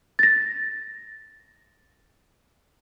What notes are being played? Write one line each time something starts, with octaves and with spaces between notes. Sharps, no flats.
A6 A#6